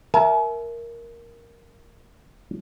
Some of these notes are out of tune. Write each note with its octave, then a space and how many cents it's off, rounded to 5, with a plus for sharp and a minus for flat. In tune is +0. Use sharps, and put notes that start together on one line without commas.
A#4 +5 E5 +0 G#5 +45